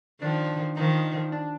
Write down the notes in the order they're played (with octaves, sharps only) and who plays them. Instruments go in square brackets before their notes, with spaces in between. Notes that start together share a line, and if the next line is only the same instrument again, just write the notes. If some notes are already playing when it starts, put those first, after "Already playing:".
[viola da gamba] D#3 F3 [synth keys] D4
[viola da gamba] D#3 F3 [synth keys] D#4
[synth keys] D4